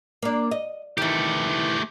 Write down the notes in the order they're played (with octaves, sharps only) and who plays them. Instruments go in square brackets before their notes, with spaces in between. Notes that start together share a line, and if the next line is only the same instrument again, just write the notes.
[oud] A#3 D4
D#5
[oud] D#3 E3 [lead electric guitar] A3 G4